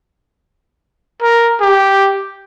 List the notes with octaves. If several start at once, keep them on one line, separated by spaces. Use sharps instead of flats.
A#4
G4